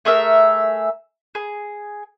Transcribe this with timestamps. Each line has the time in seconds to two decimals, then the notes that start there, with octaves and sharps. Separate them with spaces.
0.05 A3 G#4 A#4 E5
1.35 G#4